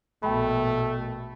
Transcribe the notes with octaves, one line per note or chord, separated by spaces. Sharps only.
A#1 B2 A3 G5 B5